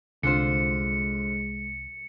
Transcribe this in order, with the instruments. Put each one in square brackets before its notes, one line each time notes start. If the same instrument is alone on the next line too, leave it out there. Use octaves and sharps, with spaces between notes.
[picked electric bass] C2 [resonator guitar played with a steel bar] D3 F4 C5 [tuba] G#3 [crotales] C#7